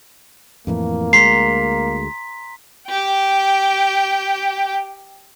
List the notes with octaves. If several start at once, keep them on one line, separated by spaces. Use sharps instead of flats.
F2 A2 E3 A#3
D2 G#3 A#5 C6 B6 C7
G4 G5